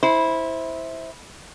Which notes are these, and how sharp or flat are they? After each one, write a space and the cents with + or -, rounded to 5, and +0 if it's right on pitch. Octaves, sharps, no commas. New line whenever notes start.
E4 -15 C5 +0